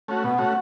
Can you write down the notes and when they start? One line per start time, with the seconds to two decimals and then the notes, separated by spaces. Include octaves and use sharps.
0.08 A3 C#4 F#4
0.23 B2 F#5
0.38 A3 C#4 F#4